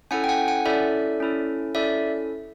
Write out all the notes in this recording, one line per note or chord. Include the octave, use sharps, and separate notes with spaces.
C#4 E4 A4 F#5 G#5
G5
F#5 G#5
F#5 G#5
C#4 E4 A4 D5 E5
C#4 E4 A4
C#4 E4 A4 D5 E5